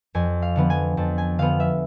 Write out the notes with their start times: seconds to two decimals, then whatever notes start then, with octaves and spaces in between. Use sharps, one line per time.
0.15 F2 G#5
0.42 F5
0.56 D3 F3 B3
0.70 G#5
0.97 F2 A5
1.18 G#5
1.38 D3 F3 B3 F5
1.60 E5